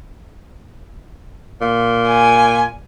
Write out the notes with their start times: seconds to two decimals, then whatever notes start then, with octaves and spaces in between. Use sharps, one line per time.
1.61 A#2
2.08 G#5